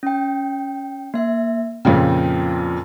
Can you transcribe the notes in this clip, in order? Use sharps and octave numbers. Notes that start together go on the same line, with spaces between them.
C#4 G5
A#3 E5
F2 A#2 C#3 G5